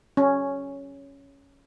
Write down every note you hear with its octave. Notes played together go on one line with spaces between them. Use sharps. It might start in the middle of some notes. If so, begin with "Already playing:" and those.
C#4